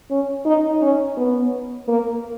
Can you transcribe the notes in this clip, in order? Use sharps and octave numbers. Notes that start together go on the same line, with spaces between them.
C#4
D#4
C#4
B3
A#3